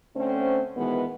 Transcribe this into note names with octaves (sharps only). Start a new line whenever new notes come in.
D3 A3 C4 C#4 C5
B2 D#3 E3 G#3 B3